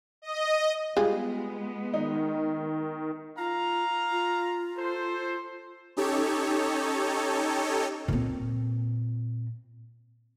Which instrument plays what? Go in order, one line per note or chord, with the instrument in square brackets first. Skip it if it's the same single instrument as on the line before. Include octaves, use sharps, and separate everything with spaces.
[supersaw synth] D#5
[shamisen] G3 F4 G#4 [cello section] G#3 B3
[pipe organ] D#3 [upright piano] D#4
[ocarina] F4 [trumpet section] F5 A#5
[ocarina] F4
[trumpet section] A4 C5
[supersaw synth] C#4 D#4 G4 A4 C#5
[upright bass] A#2 C4